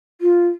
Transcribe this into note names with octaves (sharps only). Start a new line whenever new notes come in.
F4